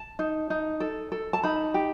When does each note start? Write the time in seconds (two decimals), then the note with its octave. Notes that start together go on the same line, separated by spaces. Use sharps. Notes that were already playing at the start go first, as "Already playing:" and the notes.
Already playing: A5
0.19 D#4
0.50 D#4
0.80 A4
1.12 A4
1.33 A5
1.43 D#4 B5
1.74 G4